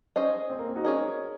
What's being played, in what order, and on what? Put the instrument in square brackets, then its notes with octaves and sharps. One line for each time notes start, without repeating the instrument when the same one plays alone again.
[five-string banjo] C#4 G#4 C5 D#5
[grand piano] C4
A#3
C4
D#4 F#4
[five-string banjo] C#4 G#4 D#5 [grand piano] A#4 C#5